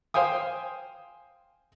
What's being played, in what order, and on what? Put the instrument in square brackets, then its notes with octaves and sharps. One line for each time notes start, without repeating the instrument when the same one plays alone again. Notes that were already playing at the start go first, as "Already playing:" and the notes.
[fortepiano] C5 F5 G5 G#5 D#6